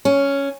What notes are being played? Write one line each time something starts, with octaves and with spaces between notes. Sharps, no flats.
C#4